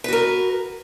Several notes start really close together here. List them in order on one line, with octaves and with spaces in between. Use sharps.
B4 F#4 A#4